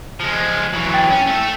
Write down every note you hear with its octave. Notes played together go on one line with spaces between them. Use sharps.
F3 G#3
E3 F#3
G5 A6
C#4
A3 A4